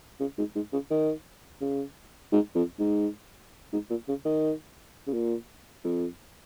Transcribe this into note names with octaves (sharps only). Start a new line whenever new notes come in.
C#3
G#2
G#2
C#3
D#3
C#3
G#2
F2
G#2
G#2
A#2
C#3
D#3
C#3
A#2
F2